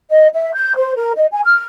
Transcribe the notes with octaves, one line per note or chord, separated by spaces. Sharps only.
D#5
E5
G6
C5
A#4
D#5
G#5
F6